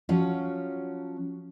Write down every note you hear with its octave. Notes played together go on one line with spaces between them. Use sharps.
F3 F#3 C#4